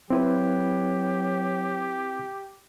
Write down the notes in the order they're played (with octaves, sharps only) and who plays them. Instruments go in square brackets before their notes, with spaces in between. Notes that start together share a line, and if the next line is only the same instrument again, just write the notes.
[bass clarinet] F#3 [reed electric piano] C4 E4 B4 [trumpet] G4